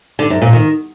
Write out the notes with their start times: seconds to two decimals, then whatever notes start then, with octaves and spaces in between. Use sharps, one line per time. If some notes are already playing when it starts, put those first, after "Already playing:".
0.19 D3
0.30 F#2
0.42 A#2
0.53 D#3